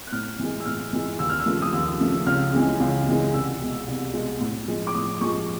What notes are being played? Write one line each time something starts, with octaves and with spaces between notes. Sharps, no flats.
F#6
A2 F6
E3 G#3
E6
A2 F6
E3 G#3
D#2 E6
F6
E6
C#3 F3 A3
D#6
D#2 E6
C#3 F3 A3
C#2 F6
C#3 E3 G#3
C#2
C#3 E3 G#3
C2 E6
B2 G#3
C2
B2 G#3
A2
F3 G#3
D6
A2 D#6
F3 G#3 C#6